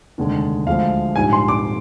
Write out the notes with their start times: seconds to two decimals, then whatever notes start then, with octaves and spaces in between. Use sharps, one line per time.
0.18 F1 D#2 D3 G#3
0.67 D2 D3 F3 G#3 F5
1.16 A#1 G#2 G3 G#5
1.33 C6
1.48 D6